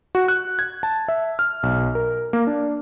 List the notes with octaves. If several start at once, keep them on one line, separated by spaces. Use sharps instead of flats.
F#4
F#6
G#6
A5
E5
F6
B1
A#4
A#3
D4